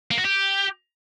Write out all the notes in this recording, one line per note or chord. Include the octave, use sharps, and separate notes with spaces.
A#3
F#4
G4